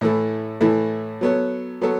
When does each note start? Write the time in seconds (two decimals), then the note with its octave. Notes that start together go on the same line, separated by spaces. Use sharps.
0.01 A2 E3 A3 E4 A4
0.61 A2 E3 A3 E4 A4
1.21 F#3 B3 A4 C#5
1.81 F#3 B3 A4 C#5